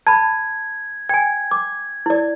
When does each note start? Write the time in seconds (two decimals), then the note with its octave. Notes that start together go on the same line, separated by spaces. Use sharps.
0.07 A5 B5 G#6
1.09 G5 G#5 G#6
1.51 D6
2.06 E4 D5